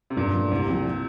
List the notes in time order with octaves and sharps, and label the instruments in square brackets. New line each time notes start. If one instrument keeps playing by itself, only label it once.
[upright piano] C3
[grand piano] G2 [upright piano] A#2
[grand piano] F3 A3
[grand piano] C2 [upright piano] C3
[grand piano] A#2 F3 C4 G4